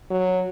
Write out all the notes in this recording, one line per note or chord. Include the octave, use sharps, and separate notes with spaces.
F#3